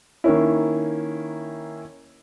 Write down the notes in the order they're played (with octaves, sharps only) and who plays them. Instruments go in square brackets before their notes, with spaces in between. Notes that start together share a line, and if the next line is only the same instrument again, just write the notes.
[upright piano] D#3 A#3 C#4 E4